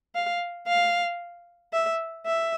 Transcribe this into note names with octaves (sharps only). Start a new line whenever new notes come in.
F5
F5
E5
E5